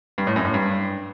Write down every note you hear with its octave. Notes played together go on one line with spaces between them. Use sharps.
G2
A2
F#2
A2
G2